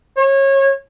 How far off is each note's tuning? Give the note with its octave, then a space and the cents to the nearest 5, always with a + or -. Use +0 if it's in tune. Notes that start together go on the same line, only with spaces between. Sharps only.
C#5 -25